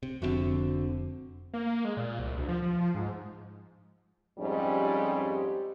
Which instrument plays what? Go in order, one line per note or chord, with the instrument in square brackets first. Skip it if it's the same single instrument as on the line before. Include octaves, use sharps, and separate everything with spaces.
[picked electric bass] C3
[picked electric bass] F1 G#2 C4 [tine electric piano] F2 [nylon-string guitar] D3 F#4 E5
[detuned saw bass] A#3
G#3
A#2
C2
D2
F3
F3
F3
G#2
[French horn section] F2 G#2 G3 C#4 G4